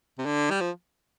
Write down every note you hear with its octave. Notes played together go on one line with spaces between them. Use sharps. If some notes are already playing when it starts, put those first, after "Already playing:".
C3
D3
G3
F3